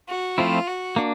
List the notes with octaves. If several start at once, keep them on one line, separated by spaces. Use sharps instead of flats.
F#4
F3 A3 C4 E4 F4
F#4
A#3 D4